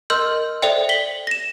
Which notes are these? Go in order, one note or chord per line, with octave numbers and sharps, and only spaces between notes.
A#4 D#5 C6 E6 F6 G6
A4 C5 D5 E5 G5
B6 F#7 G7
A#6 E7